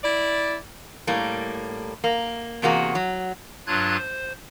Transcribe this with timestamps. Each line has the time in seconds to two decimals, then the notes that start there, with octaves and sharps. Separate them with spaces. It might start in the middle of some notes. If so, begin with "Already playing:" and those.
0.03 E4 D5
1.07 A2 G3 A#3
2.04 A#3
2.62 E2 C3 A#3 F#4 G#4
2.95 F#3
3.67 G2 F#3 D4 F4 F#6 G#6
3.97 C5